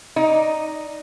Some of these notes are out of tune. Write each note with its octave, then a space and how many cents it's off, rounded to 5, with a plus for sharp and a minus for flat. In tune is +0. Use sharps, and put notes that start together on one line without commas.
D#4 +0 D5 +0